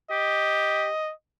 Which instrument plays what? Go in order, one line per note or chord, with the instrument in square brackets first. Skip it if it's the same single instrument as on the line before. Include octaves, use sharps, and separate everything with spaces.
[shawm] G4 [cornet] D#5